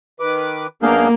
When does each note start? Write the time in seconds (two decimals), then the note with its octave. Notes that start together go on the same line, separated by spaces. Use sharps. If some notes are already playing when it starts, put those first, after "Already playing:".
0.20 D#3 B4 D6
0.83 F#2 A#3 B3 D4 G#4 F5 G6